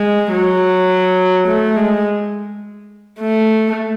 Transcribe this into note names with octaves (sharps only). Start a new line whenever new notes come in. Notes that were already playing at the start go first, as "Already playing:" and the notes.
Already playing: G#3
F#3
A3
G#3
A3